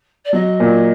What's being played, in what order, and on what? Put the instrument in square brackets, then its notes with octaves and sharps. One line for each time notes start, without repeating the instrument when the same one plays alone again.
[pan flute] D5
[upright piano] F#3 [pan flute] D#5
[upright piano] A#2